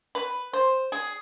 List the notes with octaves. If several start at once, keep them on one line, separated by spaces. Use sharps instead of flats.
B4
C5
G#4